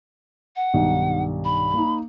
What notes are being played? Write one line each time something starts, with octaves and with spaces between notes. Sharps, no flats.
F#5
B1 G2 D#3
B5
A#3 D#4